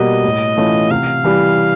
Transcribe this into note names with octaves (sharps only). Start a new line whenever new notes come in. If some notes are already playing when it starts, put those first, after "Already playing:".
Already playing: B2 G3 A#3 D#5
A2
E3 A3 C#4 F4
C3 F5
E3 G3